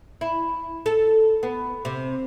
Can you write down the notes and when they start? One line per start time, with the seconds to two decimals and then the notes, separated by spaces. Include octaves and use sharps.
0.21 E4
0.86 A4
1.43 B3
1.85 C3